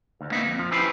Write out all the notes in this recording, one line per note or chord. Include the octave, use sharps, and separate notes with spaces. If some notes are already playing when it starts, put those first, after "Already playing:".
D2
A#3 B3 D#4 D#5 E5
F2
F3
C#4 E4 G4 B4 C5 B5